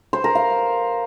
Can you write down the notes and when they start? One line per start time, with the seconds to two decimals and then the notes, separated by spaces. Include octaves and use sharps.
0.13 C5
0.24 A#4
0.35 F5